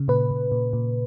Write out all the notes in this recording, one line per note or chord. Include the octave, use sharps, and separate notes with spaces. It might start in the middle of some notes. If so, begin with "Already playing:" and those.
Already playing: C#3
A#2 B4
A#2
A#2
A#2